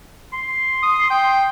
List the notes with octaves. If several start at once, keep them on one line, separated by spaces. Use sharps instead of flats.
C6
D#6
G5